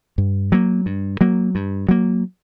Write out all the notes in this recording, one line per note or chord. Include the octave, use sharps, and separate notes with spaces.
G2
F#3 A#3
G2
F#3 A#3
G2
F#3 A#3